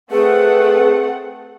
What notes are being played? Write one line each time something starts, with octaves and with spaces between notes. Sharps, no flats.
A3 C4 G#4 B4 F#5